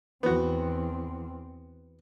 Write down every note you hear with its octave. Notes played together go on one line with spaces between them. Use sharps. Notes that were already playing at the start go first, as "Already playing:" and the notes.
E2 B3 C4 F#4